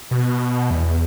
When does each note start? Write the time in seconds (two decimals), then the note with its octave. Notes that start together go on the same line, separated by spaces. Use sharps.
0.11 B2
0.70 E2